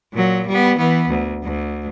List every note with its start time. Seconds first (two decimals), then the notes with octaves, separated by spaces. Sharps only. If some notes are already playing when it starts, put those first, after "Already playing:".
0.13 A#2 F#3
0.48 G3 B3
0.77 E3 B3
1.08 D2
1.43 D2